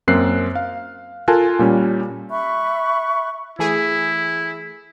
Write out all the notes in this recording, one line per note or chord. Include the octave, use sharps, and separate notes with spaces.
F#2 A#3 C4 F#6 C7
F5
F4 A4 A#4 G#5 A5 F#6
A#2 G3 C#4
E5 B5 C#6 F#6
E3 A3 E4 G#4